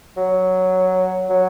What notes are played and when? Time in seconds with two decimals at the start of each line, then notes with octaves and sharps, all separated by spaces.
0.17 F#3
1.30 F#3